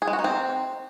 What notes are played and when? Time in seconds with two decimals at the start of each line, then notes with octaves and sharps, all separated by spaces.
0.02 G#4
0.07 G#3
0.13 F#4
0.19 D#4
0.24 C4